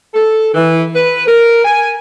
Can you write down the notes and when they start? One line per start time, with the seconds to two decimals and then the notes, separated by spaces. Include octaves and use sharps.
0.14 A4
0.54 E3
0.95 B4
1.27 A#4
1.65 G#5